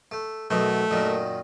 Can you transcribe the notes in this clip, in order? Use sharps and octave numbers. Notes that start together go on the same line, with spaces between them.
A3
B1 F#2 B2 A3
F#2 A#2 D#3